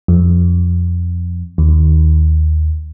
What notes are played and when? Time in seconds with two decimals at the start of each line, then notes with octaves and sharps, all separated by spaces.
0.08 F2
1.58 D#2